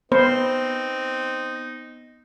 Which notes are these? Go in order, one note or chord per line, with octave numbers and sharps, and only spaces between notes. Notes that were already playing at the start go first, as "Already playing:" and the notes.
B3 C4 D#4 C5